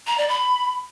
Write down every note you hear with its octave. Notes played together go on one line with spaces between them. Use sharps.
A#5
D5
B5